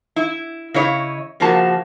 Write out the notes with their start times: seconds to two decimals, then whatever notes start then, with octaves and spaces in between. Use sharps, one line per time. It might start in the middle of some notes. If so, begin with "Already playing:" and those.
0.16 E4
0.74 C#3 E4 C#5 D#5
1.40 C#3 F3 A#3 F#4 A5